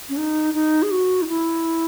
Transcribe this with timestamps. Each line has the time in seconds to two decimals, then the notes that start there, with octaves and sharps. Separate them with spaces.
0.09 C#4
0.17 D#4
0.54 D#4
0.83 G#4
0.91 F#4
1.22 D#4
1.28 E4